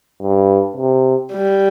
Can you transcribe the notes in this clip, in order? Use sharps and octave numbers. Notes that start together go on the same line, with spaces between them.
G2
C3
G3